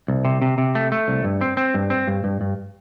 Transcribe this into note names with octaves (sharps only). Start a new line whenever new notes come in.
C2
C3
C3
C3
A3
A3
C2
G2
C4
C4
G2
C4
G2
G2
G2